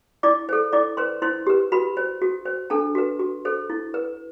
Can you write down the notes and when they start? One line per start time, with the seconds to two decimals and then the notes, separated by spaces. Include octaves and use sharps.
0.23 E4 D5 D6
0.49 A4 C5
0.73 E4 D5 D6
0.97 B4 C5 C6
1.22 E4 C5 C6
1.47 G4 B4
1.72 F#4 B4 B5
1.97 C5
2.22 F#4
2.45 C5
2.70 D4 A4 A5
2.95 F#4 B4
3.19 F#4
3.45 A4 C5
3.70 E4
3.94 B4